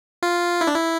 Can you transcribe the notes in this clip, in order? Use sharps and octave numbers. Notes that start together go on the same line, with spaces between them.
F4
E4
D4
E4